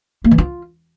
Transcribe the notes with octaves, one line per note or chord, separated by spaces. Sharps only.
A#3
E3
F4